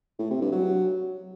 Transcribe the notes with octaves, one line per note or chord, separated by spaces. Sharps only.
A2
C3
G2
F#3